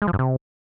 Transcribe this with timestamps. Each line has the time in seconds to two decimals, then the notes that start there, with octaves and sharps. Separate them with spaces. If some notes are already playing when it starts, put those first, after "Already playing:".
0.02 G#3
0.07 F3
0.13 G2
0.19 C3